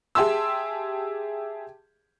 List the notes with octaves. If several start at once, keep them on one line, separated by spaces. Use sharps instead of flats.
G4 G#4 E5 A5 C6 E6